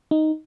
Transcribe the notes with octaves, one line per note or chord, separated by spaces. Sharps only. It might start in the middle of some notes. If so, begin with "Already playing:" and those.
D#4